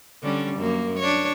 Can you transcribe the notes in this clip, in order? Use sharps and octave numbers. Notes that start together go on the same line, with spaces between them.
D3 G3 C#4
F#2 A#3
D4 C#5